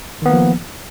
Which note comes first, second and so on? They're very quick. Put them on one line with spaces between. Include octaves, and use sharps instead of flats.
D#3 B3 A#3 F3